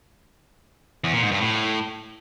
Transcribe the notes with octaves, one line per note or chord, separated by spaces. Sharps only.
E2
A#2
G#2
G2
A2